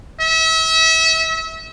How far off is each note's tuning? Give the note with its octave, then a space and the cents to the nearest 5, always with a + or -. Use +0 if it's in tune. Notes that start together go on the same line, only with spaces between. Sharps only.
E5 -35